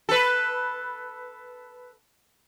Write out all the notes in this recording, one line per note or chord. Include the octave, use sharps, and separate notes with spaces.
A4 B4